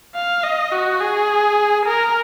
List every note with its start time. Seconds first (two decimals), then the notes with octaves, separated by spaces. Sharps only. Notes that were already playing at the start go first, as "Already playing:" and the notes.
0.15 F5
0.43 D#5
0.72 F#4
1.01 G#4
1.86 A#4